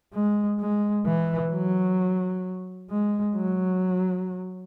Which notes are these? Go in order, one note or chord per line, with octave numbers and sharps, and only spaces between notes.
G#3
G#3
E3
F#3
G#3
F#3